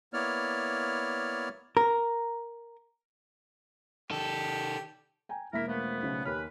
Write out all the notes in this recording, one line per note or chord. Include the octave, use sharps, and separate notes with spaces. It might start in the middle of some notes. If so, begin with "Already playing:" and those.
A#3 B3 E4 C#5 D5 F6
A#4
D#3 G4 A4
G5 G#5 A#5
E1 A#3 E4 A#4 B6
F3 A3 B3
B1 C#3
D#2 C#4 G4 B4 F6